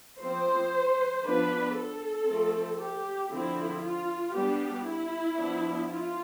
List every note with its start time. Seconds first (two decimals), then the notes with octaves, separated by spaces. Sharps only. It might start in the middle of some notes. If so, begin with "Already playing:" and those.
0.21 F3 C4 C5
1.24 F3 B3 D4 B4
1.77 A4
2.27 F3 A3 C4
2.79 G4
3.32 D3 F3 C4 E4
3.83 F4
4.35 G3 B3 D4 G4
4.87 E4
5.38 F3 B3 D4
5.90 F4